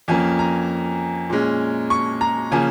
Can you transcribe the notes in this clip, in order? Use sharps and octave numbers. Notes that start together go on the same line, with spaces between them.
F2 F3 A#3 C#4 G#5
A#5
A#2 G#3 C#4
C#6
A#5
C#3 F3 A#3 C#4 G#5